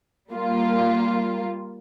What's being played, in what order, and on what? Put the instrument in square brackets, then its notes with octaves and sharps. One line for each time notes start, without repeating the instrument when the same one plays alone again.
[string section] G3 A#3 F4